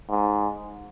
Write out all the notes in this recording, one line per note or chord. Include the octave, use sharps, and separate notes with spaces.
G#2